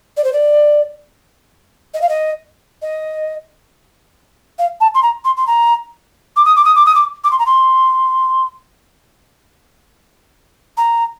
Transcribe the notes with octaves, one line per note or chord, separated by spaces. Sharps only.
D5
C5
D5
D#5
F5
D#5
D#5
F5
A5
C6
A#5
C6
C6
A#5
D6
D#6
D6
D#6
D6
D#6
D6
D6
C6
A#5
C6
A#5